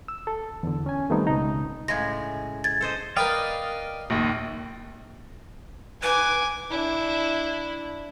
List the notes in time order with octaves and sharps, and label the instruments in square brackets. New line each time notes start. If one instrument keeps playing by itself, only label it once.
[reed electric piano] E6
A4
E2 D3
C#4 G#5
D#3 G3 A3 B3 C4 D#4
C#2 B2 D#4
[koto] A2 C#3 G#3 [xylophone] G#6 A#6
[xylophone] G#6 A6
[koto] A4 C5 D#5
[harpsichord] A#4 B4 G5 [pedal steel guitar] D5 D#5 F5
[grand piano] A#1 D#2
[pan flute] B4 [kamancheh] G#5 D6
[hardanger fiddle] D4 E4